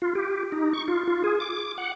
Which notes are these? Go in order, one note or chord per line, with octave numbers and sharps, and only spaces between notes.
F4
G4
D#4
C#6
F4
F4
G#4
D6
F#5